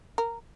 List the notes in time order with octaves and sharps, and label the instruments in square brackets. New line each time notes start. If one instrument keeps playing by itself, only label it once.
[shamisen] A#4